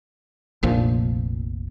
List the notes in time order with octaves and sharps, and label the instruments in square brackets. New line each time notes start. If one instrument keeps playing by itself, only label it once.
[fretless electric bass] F1 A#1 A#2 F3